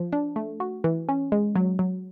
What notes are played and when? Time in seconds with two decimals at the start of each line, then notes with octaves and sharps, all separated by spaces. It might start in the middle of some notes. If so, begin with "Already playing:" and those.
Already playing: F3
0.13 D4
0.36 A3
0.60 F#4
0.84 E3
1.09 C#4
1.32 G#3
1.56 F#3
1.79 F#3